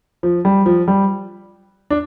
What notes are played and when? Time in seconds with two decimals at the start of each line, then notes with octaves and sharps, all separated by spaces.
0.23 F3
0.45 G3
0.66 F3
0.88 G3
1.90 D4